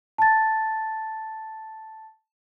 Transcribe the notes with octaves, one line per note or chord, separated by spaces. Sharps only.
A5 A6